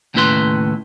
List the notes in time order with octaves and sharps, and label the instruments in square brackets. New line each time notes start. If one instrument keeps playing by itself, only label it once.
[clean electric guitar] D#2 A2 C#3 E4 B4 C6